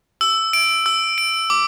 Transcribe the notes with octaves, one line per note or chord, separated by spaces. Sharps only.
E6
D7
E6
D7
D6